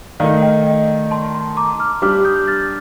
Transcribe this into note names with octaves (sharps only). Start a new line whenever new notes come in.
D#3 A3 D#4 D5 F5
D#5 G5
D#5
A5 C6
A5 C6
A#5 D6
D6 F6
G3 D4 G4 D6 F6
D#6 G6
F6 A6